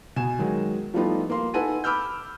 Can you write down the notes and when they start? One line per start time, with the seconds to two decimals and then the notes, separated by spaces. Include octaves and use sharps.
0.16 B2 G#5 E7
0.39 D#3 F#3 G#3
0.94 F3 G3 A3 B3 D#4 F4
1.30 A#3 C6
1.54 D#4 A4 B4 F#5 G#5 D#7
1.84 B5 D6 E6 F6 G6